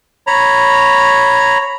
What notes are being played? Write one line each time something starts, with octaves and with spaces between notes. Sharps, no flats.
C#5 A#5 B5